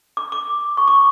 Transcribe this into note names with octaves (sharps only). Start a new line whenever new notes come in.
D6
D6
C#6
D6